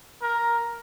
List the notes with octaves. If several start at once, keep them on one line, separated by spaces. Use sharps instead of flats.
A#4